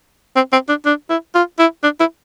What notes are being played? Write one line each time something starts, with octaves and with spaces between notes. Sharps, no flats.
C4
C4
D4
D4
E4
F4
E4
D4
E4